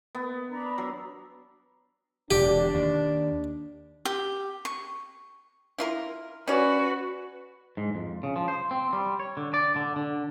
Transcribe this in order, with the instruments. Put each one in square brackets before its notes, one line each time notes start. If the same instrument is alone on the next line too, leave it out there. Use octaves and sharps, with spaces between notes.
[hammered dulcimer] B3
[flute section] D4 A#5 B5
[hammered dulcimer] F#3
[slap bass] E1 D3 [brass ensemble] D4 [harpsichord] G4
[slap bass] D#2
[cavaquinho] G4
C#6
[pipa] E4 F4 A#4
[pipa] C#4 C#5 D5 [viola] F#4 B4
[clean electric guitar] G#2
F2
C#3
F3
C5
C4
G3
C#5
D3
D5
D3
D3